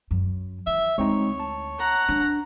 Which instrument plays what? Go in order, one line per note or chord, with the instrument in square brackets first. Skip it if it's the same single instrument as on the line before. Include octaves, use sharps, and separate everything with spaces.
[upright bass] F#2
[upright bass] E3 [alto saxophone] E5
[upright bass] D2 [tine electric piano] G#3 C4 D#4 [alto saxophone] C#5
[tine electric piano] A5
[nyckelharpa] F#5 A#5
[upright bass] D4